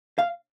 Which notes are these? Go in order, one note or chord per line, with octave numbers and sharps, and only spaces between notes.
F5